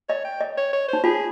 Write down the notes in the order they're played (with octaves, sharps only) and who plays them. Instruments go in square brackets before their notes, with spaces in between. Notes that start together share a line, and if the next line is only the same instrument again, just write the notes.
[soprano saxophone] C#5 [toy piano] D#5
[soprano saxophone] G5
[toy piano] D#5
[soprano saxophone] C#5
C#5
[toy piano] D#4 [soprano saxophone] C5
[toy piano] F4 [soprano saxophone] G#4